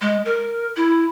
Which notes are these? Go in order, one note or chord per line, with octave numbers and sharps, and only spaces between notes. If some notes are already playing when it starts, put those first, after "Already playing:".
G#3
A#4
E4